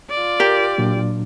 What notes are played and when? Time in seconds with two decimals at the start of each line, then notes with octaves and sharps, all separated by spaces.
0.10 F4 D5
0.40 G4 A#4
0.78 A#2 F#3 D4